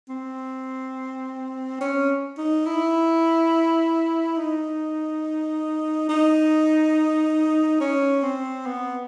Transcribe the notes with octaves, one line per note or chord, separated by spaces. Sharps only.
C4
C#4
D#4
E4
D#4
D#4
C#4
C4
B3